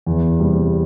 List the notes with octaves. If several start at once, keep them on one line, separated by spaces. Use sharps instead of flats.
E2
C3 G3 A#3